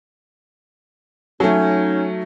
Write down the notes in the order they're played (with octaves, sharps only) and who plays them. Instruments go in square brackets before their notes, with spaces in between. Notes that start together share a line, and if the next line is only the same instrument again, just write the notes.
[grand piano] F#3 A3 [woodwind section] C#4 D#4